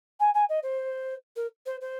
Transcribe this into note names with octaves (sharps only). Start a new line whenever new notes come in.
G#5
G#5
D#5
C5
A#4
C5
C5